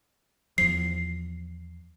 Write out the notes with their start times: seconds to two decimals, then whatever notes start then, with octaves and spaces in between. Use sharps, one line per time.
0.58 E2 F3 C7